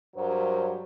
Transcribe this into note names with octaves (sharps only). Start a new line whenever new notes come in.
G2 F#3 A#4 C5